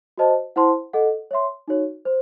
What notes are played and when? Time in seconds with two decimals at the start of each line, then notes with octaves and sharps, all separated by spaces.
0.18 F#4 C5 D#5 A5
0.56 E4 C5 F#5 A5 C6
0.93 A4 D#5 F#5
1.31 C#5 E5 C6
1.68 D#4 F#4 C#5
2.05 C5